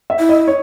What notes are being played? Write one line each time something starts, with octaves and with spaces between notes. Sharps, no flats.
E5
E4
D#5
C#5